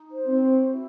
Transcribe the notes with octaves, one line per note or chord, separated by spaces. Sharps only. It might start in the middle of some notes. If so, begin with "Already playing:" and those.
Already playing: D#4
C5
C4
F#4
E4